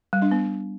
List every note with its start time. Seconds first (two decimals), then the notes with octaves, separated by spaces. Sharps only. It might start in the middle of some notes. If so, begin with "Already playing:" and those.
0.13 G3
0.22 D4
0.31 B3